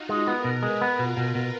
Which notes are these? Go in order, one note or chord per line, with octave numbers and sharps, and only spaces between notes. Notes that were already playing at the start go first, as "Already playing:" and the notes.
Already playing: D#4 F4 F#4
G#3
B3 A#4
B2
G#3 B4
B3
B2 F4
B2
B2